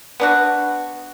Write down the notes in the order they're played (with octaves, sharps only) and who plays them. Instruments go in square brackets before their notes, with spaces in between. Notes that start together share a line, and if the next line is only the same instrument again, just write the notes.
[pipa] B3 D4 F#4